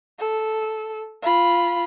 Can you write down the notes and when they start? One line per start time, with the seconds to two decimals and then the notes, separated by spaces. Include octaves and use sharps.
0.19 A4
1.22 F4 B5